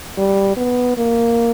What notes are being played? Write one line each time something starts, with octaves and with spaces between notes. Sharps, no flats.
G3
B3
A#3